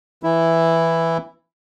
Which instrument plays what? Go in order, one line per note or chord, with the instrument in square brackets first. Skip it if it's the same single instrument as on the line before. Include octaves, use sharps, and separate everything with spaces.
[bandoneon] E3 E4